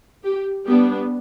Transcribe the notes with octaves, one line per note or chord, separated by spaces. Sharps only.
G4
G3 B3 D4 G4